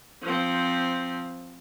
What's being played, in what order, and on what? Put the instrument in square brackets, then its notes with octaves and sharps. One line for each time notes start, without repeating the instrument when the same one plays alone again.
[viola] F3 C4